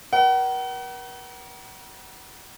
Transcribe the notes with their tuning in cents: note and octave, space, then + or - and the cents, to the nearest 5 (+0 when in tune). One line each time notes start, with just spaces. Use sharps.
A#4 +45 F#5 +40